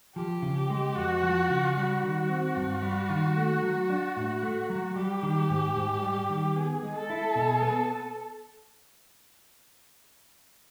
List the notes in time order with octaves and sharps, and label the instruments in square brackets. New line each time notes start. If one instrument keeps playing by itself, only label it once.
[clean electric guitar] F3 [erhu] G4
[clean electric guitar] C#3
G#3
[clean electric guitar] F2 [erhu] F#4
[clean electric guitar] F3
C#3
[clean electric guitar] G3 [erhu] F#4
[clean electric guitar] D#3
C4
G2
G3
D#3
A3
F#3
D4
A2
A3
F#3
[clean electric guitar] G3 [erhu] G4
[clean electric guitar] D#3
G#2
G#2
G3
D#3
[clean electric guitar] B3 [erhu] G#4
[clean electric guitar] G#3
[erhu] A4
[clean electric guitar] E4
B2
B3